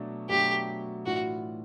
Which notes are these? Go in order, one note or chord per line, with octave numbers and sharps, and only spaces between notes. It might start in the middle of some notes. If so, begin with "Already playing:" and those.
Already playing: B2 F#3 A3 D4
B2 F#3 A3 D4 G4
A2 E3 A3 D4 F4 F#4